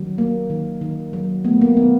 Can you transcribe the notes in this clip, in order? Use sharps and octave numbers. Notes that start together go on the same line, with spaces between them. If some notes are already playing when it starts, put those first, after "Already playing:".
Already playing: D#3 F#3
A#3
D#3
D#3
F#3
A3 B3
A#3
D#3 B3